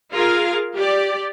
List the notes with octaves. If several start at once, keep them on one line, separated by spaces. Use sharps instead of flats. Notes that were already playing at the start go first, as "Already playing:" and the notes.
F4 G#4 A#4 F5
G4 D5